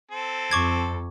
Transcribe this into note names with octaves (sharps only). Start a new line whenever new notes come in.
C4 A4
F2 C#6 D6 G#6